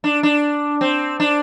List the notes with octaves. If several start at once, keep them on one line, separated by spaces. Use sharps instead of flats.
D4
D4
C4
D4